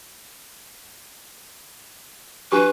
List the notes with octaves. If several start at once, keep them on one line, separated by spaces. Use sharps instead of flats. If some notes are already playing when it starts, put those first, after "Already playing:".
D4 G4 B4 C#6